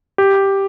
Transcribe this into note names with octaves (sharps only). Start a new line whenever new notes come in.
G4